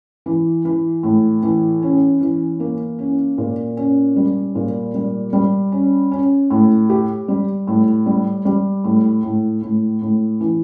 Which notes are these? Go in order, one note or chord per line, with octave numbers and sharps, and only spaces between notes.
E3
E3
A2
E3
C#4
E3
A#3
C#4
A#2
C#4
G3
A#2
G3
G3
C#4
C#4
A2
G4
G3
A2
G3
G3
A2
A2
A2
A2
E3